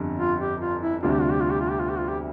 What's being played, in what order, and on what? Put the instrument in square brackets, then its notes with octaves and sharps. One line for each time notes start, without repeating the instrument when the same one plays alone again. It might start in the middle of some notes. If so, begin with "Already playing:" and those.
Already playing: [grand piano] G1 F2 D3 G3 D4
[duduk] F4
G4
F4
E4
[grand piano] D2 C3 G3 D4 [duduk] F4
[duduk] G4
F4
G4
F4
G4
F4
G4
F4
G4
F4
G4